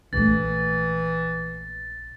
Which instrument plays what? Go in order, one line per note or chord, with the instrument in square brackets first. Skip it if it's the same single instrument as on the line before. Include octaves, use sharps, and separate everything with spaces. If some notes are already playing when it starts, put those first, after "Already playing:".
[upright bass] A#1 A3 [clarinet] E3 [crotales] A6